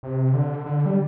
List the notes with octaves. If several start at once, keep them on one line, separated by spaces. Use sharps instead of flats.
C3
D3
D3
G3